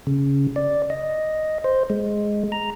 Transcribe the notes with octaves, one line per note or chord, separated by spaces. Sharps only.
C#3
D5
D#5
C5
G#3
A#5